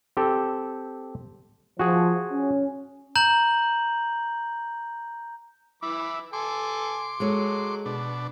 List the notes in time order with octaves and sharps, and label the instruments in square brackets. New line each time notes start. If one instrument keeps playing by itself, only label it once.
[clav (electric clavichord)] C4 G4 A4
[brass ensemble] F3 [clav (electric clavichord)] F#4 G#4
[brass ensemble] C#4
[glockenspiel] A#5 G6 F#7
[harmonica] E3 B5 D6 [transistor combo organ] E4
[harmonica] A4 G#5 [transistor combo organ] C6 D6
[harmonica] F#3 [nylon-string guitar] G#3 A4 C#5
[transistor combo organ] B2 D4